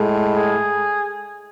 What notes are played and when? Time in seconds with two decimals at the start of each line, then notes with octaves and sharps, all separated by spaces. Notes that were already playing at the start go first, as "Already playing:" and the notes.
Already playing: A2 G#3
0.35 G#4